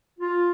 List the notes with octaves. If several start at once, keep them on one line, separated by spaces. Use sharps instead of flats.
F4